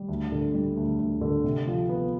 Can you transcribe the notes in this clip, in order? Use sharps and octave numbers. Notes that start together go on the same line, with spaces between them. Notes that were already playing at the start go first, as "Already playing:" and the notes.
Already playing: G3
D2
D3
G3
D2
D2
D3
C3
F3
B3